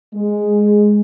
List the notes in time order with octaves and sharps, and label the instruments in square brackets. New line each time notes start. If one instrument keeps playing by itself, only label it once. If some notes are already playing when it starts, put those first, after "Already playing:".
[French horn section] G#3